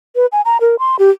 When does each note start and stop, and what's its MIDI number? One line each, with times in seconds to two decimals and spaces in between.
0.15 0.26 71
0.32 0.41 80
0.45 0.57 82
0.61 0.76 70
0.79 0.96 84
0.99 1.10 67